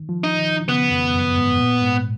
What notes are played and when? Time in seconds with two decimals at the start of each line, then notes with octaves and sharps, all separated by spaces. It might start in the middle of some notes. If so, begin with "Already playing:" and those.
Already playing: D#3
0.09 F3
0.24 D#4
0.39 D#3
0.68 C#3 B3
0.91 F2
1.14 F#2
1.37 G#2
1.59 A#2
1.82 G#2